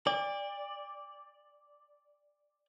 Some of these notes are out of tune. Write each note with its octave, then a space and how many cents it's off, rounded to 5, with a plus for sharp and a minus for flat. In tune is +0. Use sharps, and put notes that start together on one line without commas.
D5 +0 G5 +45